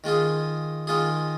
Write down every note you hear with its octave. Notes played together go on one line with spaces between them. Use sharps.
D#3 G#3 F4 G#4
D#3 G#3 F4 G#4